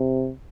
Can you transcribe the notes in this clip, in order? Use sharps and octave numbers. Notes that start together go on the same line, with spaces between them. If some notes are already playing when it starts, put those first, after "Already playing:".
Already playing: C3